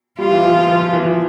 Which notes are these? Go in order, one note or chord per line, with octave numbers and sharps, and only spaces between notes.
G3 F4
E3
F3
F3
F3
F3
E3
F3